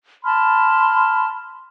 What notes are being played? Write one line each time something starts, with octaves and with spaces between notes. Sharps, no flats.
A5 B5 C6 F6